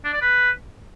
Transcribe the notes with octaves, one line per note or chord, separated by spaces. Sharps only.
D4
D5
B4